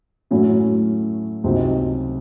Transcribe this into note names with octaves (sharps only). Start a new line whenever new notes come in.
A2 F#3 C#4 E4
C#2 C3 F#3 C4 D#4